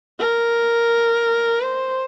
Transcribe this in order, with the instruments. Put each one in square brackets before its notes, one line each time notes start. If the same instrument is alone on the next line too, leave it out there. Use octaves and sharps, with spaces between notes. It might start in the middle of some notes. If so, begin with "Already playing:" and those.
[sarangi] A#4
C5